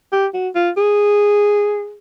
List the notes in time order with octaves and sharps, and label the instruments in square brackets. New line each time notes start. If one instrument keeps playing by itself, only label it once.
[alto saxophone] G4
F#4
F4
G#4